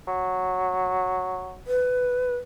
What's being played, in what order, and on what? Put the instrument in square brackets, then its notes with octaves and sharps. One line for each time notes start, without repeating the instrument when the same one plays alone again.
[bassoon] F#3
[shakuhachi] B4